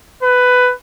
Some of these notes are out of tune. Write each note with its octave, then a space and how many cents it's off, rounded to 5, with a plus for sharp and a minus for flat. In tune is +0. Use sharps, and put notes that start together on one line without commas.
B4 +10